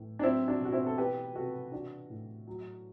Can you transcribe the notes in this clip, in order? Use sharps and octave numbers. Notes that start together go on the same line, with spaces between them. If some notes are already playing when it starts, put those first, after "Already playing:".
Already playing: A2 E3
D4
F#3 C4 E4
D4 F#4
B2 F#4
C4 E4
A4
E3 G4 B4
C3 F#4 A4
E3 D4 F#4
A2
F#3